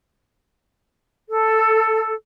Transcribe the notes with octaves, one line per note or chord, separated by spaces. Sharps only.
A4